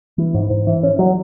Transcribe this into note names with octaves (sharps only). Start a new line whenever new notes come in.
E3
G#2
G#2
E3
C#4
F#3